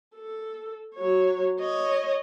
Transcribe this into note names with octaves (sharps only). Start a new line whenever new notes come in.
A4
F#3 C#5
C#5 D#5